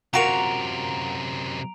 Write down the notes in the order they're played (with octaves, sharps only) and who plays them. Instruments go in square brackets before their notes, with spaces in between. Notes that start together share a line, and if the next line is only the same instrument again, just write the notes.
[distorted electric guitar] F#2 C3 [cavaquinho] F4 F#4 A#4 [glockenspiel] A#5 D7 F7